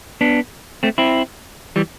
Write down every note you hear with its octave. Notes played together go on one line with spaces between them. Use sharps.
B3 D4
A3 C4
C4 E4
E3 G3